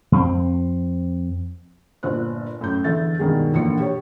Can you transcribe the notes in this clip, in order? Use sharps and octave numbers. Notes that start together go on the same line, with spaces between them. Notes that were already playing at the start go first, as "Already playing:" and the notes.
F2 C4
G1 A#2 C5 F#6
F#2 A2 G6
E2 D3 A4 E5 A6
G2 B2 D#3 G#3
E1 A#1 D3 A#3 C#7
G4 C#5